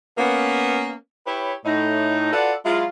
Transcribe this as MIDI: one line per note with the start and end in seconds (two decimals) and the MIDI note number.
0.18 0.94 58
0.18 0.94 59
0.18 0.94 61
1.27 1.54 64
1.27 1.54 67
1.27 1.54 71
1.27 1.54 73
1.65 2.30 45
1.65 2.30 63
2.33 2.53 65
2.33 2.53 66
2.33 2.53 69
2.33 2.53 71
2.33 2.53 74
2.33 2.53 78
2.66 2.86 54
2.66 2.86 56
2.66 2.86 64
2.66 2.86 65